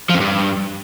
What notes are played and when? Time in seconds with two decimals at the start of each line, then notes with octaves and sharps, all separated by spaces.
0.10 F3
0.15 F2
0.20 G2